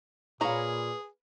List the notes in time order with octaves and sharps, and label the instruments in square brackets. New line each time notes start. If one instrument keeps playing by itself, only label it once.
[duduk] A#2 [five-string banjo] A#3 C#5 A#5 [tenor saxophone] G#4 [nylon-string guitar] B4 F5